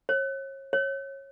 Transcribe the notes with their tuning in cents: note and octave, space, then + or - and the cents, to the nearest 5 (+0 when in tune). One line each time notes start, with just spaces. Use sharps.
C#5 -35
C#5 -20